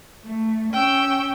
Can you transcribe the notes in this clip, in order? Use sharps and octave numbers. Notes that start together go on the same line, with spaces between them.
A3
C#4 G5 E6